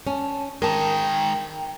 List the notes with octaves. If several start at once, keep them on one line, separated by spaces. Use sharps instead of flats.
C#4 A5
D#3 G#3 A#4 G5 A5